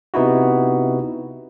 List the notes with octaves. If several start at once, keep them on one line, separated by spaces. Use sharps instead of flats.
C3 B3 D#4 E4 F#4